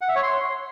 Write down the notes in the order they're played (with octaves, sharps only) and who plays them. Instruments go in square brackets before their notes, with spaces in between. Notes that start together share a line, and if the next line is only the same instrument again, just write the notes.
[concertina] F#5
E5
C#5
C6